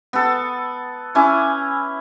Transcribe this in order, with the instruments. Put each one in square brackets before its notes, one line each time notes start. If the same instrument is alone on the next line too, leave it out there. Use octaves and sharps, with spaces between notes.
[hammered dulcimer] B3 A4
C#4 E4 G#5 D6